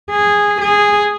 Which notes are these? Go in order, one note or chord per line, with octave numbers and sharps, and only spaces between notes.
G#4
G#4